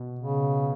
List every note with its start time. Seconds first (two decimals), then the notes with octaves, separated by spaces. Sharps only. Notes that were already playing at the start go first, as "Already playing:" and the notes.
Already playing: B2
0.19 C#3